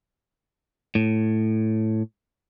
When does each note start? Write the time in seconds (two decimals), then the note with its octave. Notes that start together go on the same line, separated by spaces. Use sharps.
0.95 A2